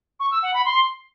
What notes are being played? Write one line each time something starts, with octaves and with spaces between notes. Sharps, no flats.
C#6
E6
F#5
B5
C6